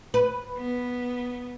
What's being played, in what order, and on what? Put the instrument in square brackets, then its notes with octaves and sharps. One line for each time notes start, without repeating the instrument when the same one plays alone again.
[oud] B4
[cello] B3